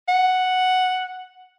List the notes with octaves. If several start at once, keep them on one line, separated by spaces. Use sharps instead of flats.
F#5